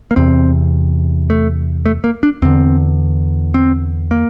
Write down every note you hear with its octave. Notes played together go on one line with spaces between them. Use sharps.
A#3
E2 C3 C4
A3
A3
A#3
D4
E2 D3 C4
C4
A#3